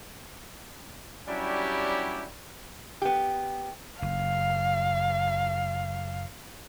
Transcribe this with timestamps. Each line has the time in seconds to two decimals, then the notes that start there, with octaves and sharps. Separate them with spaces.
1.28 F#3 G3 C#4 D4 E4 G4
3.02 B3 G4
4.02 F#1 F5